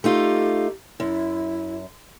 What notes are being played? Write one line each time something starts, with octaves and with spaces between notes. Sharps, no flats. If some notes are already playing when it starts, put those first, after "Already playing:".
A3 D#4 F4 G4
F#2 E4